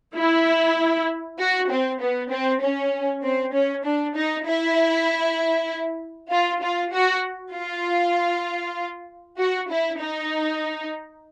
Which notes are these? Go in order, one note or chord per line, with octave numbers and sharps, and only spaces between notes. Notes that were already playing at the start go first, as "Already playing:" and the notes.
E4
F#4
C4
B3
C4
C#4
C4
C#4
D4
D#4
E4
F4
F4
F#4
F4
F#4
E4
D#4